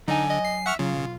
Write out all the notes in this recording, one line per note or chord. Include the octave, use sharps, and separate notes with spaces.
D3 F#3 D#4 G#5
D#5
C7
E5 F#5 C#6 F6
C#3 F#3 F4
B1